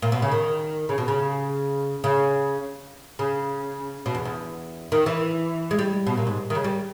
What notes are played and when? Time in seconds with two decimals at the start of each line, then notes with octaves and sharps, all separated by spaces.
0.02 A#2
0.12 B2
0.22 C#3
0.32 D#3
0.89 C#3
0.98 B2
1.08 C#3
2.04 C#3
3.19 C#3
4.06 B2
4.15 E2
4.25 E2
4.92 D#3
5.06 E3
5.71 G#3
5.79 G3
6.07 B2
6.17 A#2
6.27 G#2
6.50 D#3
6.55 C#3
6.64 G3